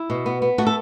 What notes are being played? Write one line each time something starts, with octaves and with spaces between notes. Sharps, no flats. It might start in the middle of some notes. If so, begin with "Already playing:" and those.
Already playing: E4
B2
B3
B3
A3 F#4
A4